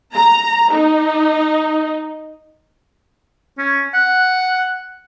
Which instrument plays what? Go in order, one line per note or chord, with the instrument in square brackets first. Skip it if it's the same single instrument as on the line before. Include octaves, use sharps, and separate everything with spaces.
[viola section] A#5
D#4
[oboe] C#4
F#5